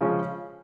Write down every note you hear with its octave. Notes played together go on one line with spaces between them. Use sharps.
C#3 F3 G#3 C#4